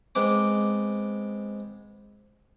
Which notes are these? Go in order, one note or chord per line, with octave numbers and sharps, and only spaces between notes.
G#3 B3 C4 D6